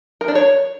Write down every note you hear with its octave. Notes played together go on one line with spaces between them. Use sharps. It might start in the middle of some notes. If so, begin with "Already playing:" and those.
A#4
D4
C#5